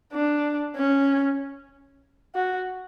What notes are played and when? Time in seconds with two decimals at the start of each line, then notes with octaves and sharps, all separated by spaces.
0.13 D4
0.76 C#4
2.35 F#4